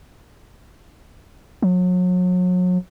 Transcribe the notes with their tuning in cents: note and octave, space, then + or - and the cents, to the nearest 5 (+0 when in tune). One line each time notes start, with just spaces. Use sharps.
F#3 -35